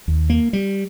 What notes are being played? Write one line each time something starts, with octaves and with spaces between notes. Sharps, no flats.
D#2
A#3
G3